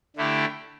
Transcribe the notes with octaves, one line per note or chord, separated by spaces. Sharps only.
D3 A3 E4 G4